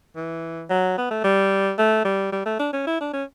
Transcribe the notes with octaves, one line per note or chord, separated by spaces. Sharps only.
E3
F#3
B3
A3
G3
A3
G3
G3
A3
D4
C#4
E4
D4
C#4